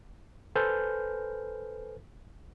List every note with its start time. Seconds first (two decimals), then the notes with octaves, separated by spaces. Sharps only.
0.56 A4 B4 C5 G#5 F6 G6